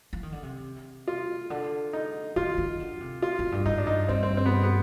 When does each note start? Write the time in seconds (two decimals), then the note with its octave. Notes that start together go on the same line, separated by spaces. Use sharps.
0.13 F3
0.23 D#3
0.32 D3
0.43 C3
1.08 F4
1.50 D3
1.93 D#4
2.36 D#3 F4
2.58 D#3
2.80 D3
3.00 C3
3.22 F4
3.39 F2
3.52 G2
3.66 G#2 D#4
3.78 D4
3.87 G2 D#4
4.09 G2 C4
4.23 C4
4.37 C4
4.46 B3
4.63 B3